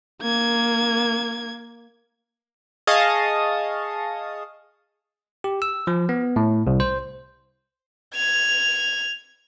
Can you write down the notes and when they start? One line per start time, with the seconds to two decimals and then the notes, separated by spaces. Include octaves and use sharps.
0.21 A#3 G#6
2.87 G#4 D#5 F5 A5 C#6 D#6
5.44 G4
5.62 E6
5.87 F3
6.09 B3
6.36 A2
6.67 C2
6.80 C5
8.15 G#6 F7